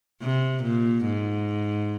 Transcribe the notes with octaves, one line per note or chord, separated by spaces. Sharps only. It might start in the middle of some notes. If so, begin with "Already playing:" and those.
C3
A#2
G#2